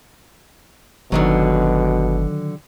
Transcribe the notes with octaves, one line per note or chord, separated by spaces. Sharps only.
G1 B2 D3 D#3 F#3